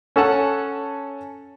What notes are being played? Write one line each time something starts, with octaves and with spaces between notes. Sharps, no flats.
C#4 A4 F#5 A5